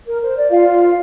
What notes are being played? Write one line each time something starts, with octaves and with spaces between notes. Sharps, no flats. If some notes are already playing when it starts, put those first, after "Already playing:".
A#4
C5
D5
F4 F5